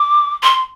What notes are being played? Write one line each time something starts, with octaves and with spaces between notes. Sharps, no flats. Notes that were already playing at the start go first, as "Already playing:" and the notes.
Already playing: D6
C6